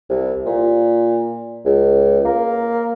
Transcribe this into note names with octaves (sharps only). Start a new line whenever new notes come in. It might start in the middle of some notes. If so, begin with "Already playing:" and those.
C2
A#2
C#2
A#3